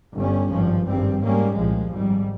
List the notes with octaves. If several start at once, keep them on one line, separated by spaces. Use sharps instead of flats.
G1 G2 G3 C#4
G#1 G2 F3
G#1 G2 G3 C4
G#2 G3 A#3 C#4
C2 A#2 F3 G#3
G#1 G#2 G3